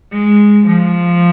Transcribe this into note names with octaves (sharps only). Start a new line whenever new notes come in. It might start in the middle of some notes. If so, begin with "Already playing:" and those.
G#3
F3